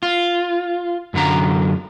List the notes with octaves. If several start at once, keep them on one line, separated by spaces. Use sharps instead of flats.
F4
F#2 D3 F#3 A#5